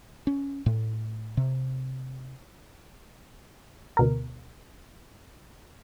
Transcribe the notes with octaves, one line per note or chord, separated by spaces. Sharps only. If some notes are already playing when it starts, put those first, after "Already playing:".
C#4
A2
C3
D2 B2 A#4